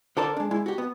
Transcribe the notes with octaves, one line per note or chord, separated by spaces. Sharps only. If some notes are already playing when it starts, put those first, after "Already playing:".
D3 A4 A#4 C5 D5
G#3 D4
G#3 E4
F#4 G4
B3